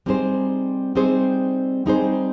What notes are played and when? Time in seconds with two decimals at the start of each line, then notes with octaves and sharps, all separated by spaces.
0.06 G3 C4 D#4 G#4 C5
0.95 G3 C4 D#4 G#4 C5
1.86 G3 C4 D#4 G#4 C5